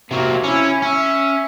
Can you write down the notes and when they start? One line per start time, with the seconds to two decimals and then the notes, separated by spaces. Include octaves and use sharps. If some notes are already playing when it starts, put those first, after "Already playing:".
0.11 C3 F#3 A#3
0.44 C#4 E4
0.82 C#4 E5